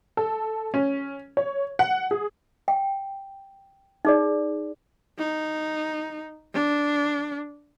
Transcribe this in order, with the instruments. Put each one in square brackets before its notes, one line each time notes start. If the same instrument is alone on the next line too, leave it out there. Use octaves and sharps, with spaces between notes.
[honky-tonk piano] A4
C#4
C#5
F#5
G#4
[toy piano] G5
D#4 G#4 D5
[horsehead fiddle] D#4
D4